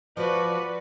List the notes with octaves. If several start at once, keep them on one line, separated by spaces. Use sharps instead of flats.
F3 F#4 B4 D5